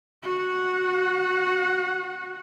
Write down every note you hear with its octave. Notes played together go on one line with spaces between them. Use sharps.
F#4 F#5